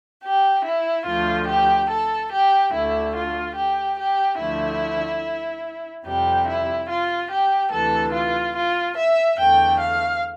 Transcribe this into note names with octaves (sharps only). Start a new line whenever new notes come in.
G4
E4
D2 D3 F3 A3 F4
G4
A4
G4
D2 D3 A3 E4
F4
G4
G4
D2 D3 F3 A3 E4
F2 C3 G3 G4
E4
F4
G4
D2 C3 E3 A4
F4
F4
E5
E2 D3 A3 G5
F5